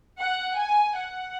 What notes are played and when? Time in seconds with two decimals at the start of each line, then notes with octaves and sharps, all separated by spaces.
0.18 F#5
0.56 G#5
0.96 F#5